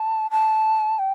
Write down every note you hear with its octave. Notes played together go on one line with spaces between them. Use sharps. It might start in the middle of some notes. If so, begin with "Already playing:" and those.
Already playing: A5
A5
G5